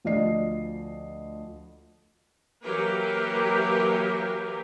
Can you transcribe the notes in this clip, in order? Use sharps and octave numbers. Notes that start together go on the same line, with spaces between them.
D2 F3 D5 D#5 C7
E3 F#3 A#3 G4 A#4 B4